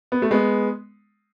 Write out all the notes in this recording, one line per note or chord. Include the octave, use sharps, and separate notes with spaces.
B3
A3
G#3 B3